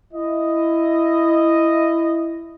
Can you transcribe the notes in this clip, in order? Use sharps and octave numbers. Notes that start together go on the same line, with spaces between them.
E4 D#5